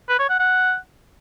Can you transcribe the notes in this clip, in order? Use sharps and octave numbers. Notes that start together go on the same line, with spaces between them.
B4
C#5
F#5
F#5